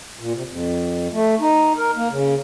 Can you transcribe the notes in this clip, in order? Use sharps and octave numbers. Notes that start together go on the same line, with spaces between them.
A#2
C3
F2
A3
D#4
A#4
A#3
C#3